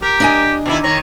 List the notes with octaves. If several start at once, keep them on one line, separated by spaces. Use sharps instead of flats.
G4 A#4
D4 D#5 G#5
B2 D#3 E4
D#3 C#5 A#5